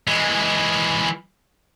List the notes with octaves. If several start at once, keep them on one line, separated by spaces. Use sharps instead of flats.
E3 G#3